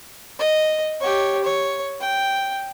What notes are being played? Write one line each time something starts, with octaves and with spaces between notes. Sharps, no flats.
D#5
G4 C#5
C#5
G5